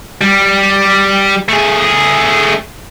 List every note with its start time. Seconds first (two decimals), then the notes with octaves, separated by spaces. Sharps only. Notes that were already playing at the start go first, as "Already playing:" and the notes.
0.21 G3
1.49 A3 G#4